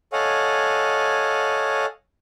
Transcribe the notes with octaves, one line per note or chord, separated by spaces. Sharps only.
A4 C#5 D#5 F5 F#5 G#5